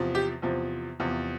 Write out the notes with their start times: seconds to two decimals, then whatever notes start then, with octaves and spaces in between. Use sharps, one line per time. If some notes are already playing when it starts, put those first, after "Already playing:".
Already playing: E2 C3 F3
0.15 G4
0.42 E2 C3 F3
1.00 E2 C3 F3